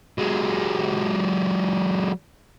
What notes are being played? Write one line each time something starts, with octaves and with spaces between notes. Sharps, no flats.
F#3 G#3